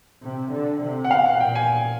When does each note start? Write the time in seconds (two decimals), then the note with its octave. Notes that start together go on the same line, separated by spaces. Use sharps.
0.23 C3
0.52 D3
0.82 C3
1.05 F#5
1.11 B2 F5
1.26 F#5
1.40 A#2 G5
1.55 G#5